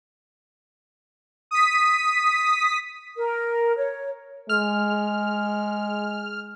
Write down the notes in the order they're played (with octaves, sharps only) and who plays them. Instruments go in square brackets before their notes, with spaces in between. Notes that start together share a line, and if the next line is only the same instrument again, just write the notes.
[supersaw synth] D#6 B6
[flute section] A#4
C#5
[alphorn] G#3 [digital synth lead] F6